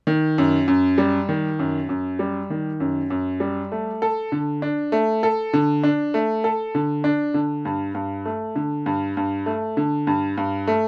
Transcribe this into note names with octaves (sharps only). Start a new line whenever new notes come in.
D#3
F#2
F#2
G3
D#3
F#2
F#2
G3
D#3
F#2
F#2
G3
A3
A4
D3
D4
A3
A4
D3
D4
A3
A4
D3
D4
D3
G2
G2
A3
D3
G2
G2
A3
D3
G2
G2
A3